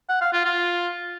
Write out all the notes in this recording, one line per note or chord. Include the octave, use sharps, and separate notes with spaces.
F#5
F5
F4
F4